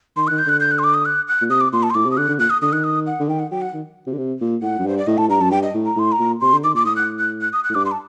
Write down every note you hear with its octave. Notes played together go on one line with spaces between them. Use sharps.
D#3 C6
F#6
D#3
G6
D3 F#6
G6
F#6
C6
D6
D#6
F#6
F#6
A#2
C3 D#6
D6
A#2 C6
A5
C6
A2 D6
C3
D#6
D3 F#6
D3
A#2 F#6
D#6
D3 D#6
D#3 F#6
D#6
F#5
D3
D#3 G5
F#5
F#3 G5
F#5
D#3
C3
D3
C3
A#2
A2 F#5
F#2
G2 C5
D5
A2 D#5
A2 A5
G2 A#5
F#2 A5
G2 G5
D#5
A2
A#5
A2 C6
A#5
A#2
C3 C6
D3
D#3 D6
A#2 D6
A2 D#6
F#6
F#6
F#6
D#6
F#6
A2
G2 D6
C6
A5